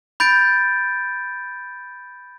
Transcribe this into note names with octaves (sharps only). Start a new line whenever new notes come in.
B5 G6 A6 D7